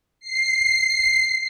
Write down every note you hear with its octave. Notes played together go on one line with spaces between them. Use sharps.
C7